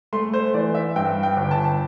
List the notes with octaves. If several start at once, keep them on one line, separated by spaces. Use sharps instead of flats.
A3 C6
C5
E3 D5
E5
G2 G5
G5
G1
A5